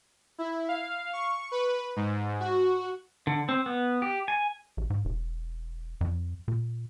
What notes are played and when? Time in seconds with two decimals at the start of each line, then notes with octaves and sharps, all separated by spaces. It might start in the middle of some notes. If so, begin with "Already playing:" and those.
0.38 E4
0.68 F5
1.13 C#6
1.51 B4
1.96 G#2
2.40 F#4
3.27 D3
3.49 C4
3.66 B3
4.02 G4
4.28 G#5
4.77 A#1
4.90 G#2
5.05 E1
6.01 F2
6.48 A#2